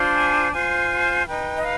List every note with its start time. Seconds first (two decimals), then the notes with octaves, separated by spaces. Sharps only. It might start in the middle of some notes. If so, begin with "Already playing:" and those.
Already playing: D4 F4 C5
0.14 G#5
0.51 F4 C5 G#5
1.25 D#4 B4 G5
1.56 D#5
1.62 F5